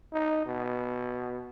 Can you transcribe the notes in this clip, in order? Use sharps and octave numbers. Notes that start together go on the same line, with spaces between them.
D#4
B2